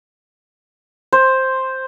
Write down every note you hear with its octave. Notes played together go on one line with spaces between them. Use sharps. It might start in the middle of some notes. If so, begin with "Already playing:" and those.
C5